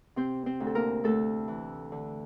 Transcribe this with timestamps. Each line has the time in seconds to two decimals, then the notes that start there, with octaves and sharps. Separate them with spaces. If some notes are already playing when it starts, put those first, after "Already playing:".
0.16 C3 C4 C5
0.46 C4 C5
0.60 D2
0.67 A4
0.75 A#3 A#4
1.04 D2 A3 A4
1.48 E3
1.92 D3